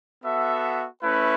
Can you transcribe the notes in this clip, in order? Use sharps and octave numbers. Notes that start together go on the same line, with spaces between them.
B3 F#4 A4 E5
A3 C#4 E4 B4